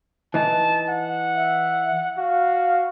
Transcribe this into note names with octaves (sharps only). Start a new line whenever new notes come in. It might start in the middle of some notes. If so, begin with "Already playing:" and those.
E3 D#4 A5
F#5
E5
F#4 F5